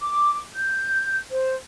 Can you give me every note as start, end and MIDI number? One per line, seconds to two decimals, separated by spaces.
0.01 0.41 86
0.56 1.17 91
1.31 1.55 72